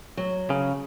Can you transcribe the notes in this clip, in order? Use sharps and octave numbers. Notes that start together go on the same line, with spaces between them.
F#3
C#3